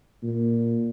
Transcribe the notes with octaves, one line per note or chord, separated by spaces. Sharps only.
A#2